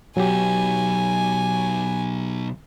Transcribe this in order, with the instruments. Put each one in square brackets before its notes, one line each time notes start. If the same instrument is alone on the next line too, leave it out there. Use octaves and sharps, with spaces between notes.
[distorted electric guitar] B1 [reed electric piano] F#3 G4 [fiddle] G#5